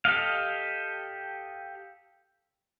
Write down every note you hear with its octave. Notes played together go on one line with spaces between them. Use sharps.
G4 A4 D#5 F5